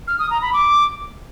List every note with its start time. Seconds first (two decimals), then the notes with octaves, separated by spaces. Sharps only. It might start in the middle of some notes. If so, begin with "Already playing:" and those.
0.07 F6
0.19 D#6
0.30 A#5
0.42 B5
0.53 D6